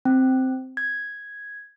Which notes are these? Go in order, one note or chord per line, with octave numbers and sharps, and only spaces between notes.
C4
G#6